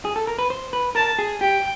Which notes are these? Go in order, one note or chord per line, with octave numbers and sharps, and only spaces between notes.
G#4
A4
A#4
B4
C5
B4
A#4 A5
G#4
G4 G5